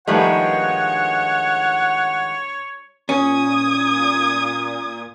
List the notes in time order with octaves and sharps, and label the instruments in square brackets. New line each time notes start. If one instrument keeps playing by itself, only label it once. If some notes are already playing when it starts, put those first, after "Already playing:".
[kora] G2 A3 B4 [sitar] D#3 F3 G#3 [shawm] C#5 [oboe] F#5
[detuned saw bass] A#2 [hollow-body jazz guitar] C#4 [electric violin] D#6 G#6